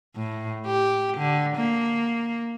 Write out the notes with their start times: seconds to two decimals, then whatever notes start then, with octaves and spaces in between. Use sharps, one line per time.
0.16 A2
0.66 G4
1.17 D3
1.57 A#3